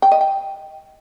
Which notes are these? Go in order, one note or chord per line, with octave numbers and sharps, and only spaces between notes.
G5
D#5
G5